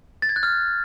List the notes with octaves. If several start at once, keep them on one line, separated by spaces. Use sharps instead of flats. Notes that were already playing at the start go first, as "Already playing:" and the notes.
A6
G#6
F#6
F6